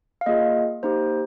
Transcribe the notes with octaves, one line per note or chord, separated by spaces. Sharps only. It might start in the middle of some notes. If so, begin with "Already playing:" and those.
F5
A#3 F4 G#4 D#5
A#3 D#4 G4 C5